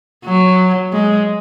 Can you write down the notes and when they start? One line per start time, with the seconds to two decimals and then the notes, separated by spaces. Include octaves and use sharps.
0.25 F#3
0.93 G#3